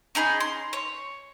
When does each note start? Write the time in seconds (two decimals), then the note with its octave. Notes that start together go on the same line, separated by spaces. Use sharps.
0.15 C#4 D#4 G#4 B5
0.40 C6
0.73 C#5